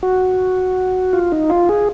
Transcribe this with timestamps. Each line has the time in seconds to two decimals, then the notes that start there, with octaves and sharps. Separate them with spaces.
0.03 F#4
1.13 F4
1.32 D#4
1.50 F4
1.69 G#4